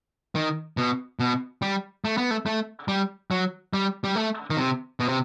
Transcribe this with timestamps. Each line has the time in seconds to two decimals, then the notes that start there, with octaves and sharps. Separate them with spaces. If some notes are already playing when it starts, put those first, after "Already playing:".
0.35 D#3
0.77 B2
1.20 B2
1.62 G3
2.05 A3
2.18 B3
2.31 A3
2.46 A3
2.88 G3
3.31 F#3
3.74 G3
4.04 G3
4.16 A3
4.50 D#3
4.57 C3
5.00 B2
5.09 C3